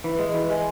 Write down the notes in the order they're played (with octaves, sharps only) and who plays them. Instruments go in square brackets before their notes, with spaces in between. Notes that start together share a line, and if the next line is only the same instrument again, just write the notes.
[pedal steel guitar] E3
G#3
E3
G#3